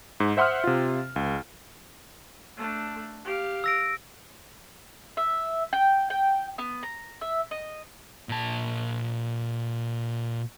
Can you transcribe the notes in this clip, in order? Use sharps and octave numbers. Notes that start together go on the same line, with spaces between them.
G#2
C5 E5 F#5 C6 D#6 F6
C3 F4
C#2
A3 D4
G4 F5
E6 A#6 D7
E5
G5
G5
B3
A#5
E5
D#5
A#2 A5